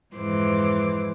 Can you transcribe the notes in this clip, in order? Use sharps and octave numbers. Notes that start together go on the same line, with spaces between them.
F2 G#2 E3 C5 D6